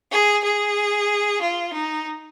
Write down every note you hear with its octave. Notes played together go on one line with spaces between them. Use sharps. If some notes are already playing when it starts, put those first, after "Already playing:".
G#4
G#4
F4
D#4